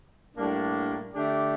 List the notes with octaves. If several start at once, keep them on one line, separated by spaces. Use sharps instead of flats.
A2 G3 A#3 D4
D3 A3 D4 G4 D5